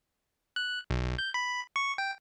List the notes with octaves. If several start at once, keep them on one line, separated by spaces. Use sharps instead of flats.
F#6
B1
G6
B5
C#6
G5